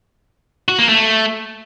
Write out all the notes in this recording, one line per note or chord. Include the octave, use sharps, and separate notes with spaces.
F#4
A#3
A3